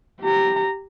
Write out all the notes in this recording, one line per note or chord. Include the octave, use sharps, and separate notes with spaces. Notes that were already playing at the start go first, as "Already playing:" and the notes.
G4 A#5